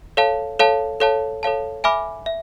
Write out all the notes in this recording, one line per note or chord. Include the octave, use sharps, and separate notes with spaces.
A4 C#5 F5 A5
A4 C#5 F5 A5
A4 C#5 F5 A5
A4 C#5 F5 A5
E5 G#5 B5 D6 F6
E5